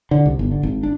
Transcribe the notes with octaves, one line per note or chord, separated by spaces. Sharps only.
D3
C2
G1
D3
G#1
D4